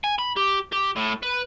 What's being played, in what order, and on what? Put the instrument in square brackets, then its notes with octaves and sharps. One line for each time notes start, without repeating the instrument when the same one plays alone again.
[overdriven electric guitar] G#5
B5
G4
G4
A2
B4